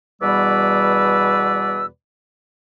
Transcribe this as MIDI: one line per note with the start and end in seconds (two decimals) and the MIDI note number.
0.21 1.86 40
0.21 1.86 47
0.21 1.86 55
0.21 1.86 71
0.21 1.86 74
0.21 1.86 88